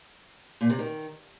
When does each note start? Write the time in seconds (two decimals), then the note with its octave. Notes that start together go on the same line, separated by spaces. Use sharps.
0.61 A#2
0.70 C3
0.79 D#3